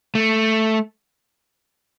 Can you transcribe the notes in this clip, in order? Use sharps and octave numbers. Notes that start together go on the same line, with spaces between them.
A3